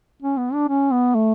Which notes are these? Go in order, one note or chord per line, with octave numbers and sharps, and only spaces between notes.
C#4
B3
D4
C#4
B3
A3